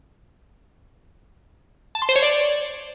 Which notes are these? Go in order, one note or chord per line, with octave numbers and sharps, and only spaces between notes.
A5
C6
C5
C#5
D5